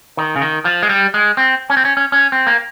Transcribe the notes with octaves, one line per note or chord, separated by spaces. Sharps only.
D#3
C#3
D#3
F3
G#3
G3
G#3
C4
C#4
C4
C#4
C#4
C#4
C4
A#3